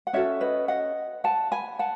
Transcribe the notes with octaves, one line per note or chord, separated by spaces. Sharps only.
F#5
C#4 F#4 A4 C#5 E5
B4 D#5
D#5 F#5
F#5 A5
G#5 B5
F#5 A5